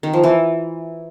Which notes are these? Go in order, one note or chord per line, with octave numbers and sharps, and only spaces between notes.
D#3
F3
E3